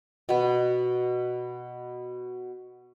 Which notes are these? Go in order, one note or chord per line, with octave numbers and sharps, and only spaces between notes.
B2 B3